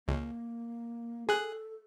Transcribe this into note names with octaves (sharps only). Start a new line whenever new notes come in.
C#2 A#3
G#4 A4 F#6